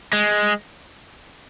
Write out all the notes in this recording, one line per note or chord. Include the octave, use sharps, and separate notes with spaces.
G#3